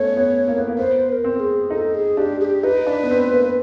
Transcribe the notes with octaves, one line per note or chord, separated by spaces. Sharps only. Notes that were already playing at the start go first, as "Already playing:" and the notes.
Already playing: A3 B3 C#4 C#5
B3
A#3
B3
A#3
B3 C5
B4
A#4
C4
G#4
D#4 A4
G#4
D4 G4
G#4
G4
D#4 B4
D4
B3
C4
A#3